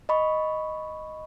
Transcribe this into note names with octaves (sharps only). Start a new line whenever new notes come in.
D#5 B5 C#6